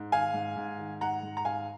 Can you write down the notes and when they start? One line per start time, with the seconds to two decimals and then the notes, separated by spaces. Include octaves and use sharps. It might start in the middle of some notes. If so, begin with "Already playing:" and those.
Already playing: G#2
0.12 D#3 F5 G#5
0.34 G#2
0.57 G#2
0.79 D#3
1.01 G#2 F#5 A#5
1.23 G#2
1.37 A#5
1.45 G#2 F5 G#5